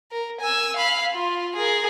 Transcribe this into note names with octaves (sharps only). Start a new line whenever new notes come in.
A#4
G#5 E6
F5 B5
F4
G#4 A#4